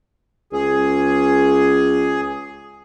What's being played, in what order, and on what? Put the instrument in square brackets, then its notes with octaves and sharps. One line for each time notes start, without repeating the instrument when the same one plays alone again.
[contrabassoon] C#2 [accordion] G#4